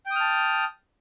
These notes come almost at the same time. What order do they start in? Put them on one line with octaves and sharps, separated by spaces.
G5 D#6 F6 A5